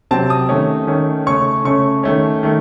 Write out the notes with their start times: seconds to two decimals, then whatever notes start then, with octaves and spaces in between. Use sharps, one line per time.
0.11 C3 F#3 C4 A5
0.30 D#6
0.49 D#3 A3 C#4
0.87 D#3 A3 C#4
1.26 C#3 A3 C#4 C#6
1.65 C#3 A3 C#4 C#6
2.03 D#3 A3 C#4
2.43 D#3 A3